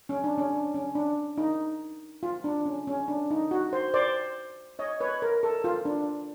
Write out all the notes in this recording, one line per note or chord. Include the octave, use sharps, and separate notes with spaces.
C#4
D4
C#4
D4
C#4
D4
D#4
F4
D4
C#4
C#4
D4
D#4
F#4
C5
C5 D5
C#5 D#5
B4 C#5
A#4
A4
F4
D4